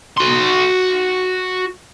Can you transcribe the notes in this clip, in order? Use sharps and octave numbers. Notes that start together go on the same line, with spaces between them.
F#4 C6